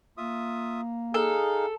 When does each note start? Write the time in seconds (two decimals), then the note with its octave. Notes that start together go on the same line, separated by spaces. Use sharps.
0.17 A#3 F4 E5 D#6
1.14 D#4 G#4 A4 F5